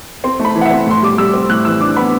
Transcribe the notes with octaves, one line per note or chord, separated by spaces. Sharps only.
C4 C6
A3
B5
E3
F#5
E5
C4
A2 C6
G3 D6
G3 E6
C4
A2 F#6
E3 E6
D4 D6
B3 B5